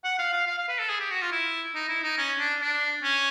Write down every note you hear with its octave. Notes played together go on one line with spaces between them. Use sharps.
F#5
F5
F5
F5
F5
B4
A4
G#4
G4
F#4
F4
E4
D#4
E4
D#4
C#4
D4
D4
C#4